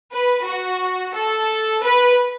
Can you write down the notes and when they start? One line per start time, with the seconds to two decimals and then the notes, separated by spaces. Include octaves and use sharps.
0.13 B4
0.46 F#4
1.14 A4
1.83 B4